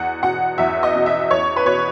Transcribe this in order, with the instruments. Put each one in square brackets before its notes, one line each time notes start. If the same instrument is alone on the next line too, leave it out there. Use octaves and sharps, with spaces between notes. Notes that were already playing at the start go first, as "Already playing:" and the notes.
Already playing: [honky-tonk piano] E2 F#5
B2 F#5
E2 E5
D#5
B2
E5
E2 C#5
B4
B2 C#5